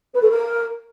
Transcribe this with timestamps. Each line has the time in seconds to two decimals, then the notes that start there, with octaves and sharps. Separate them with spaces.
0.14 B4
0.22 A4
0.29 A#4